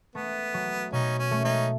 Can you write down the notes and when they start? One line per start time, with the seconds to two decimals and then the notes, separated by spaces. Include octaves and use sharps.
0.15 A3 B3
0.54 F#3
0.92 B2 C#4 D#4
1.19 C#4
1.31 A3
1.44 C#4 D#4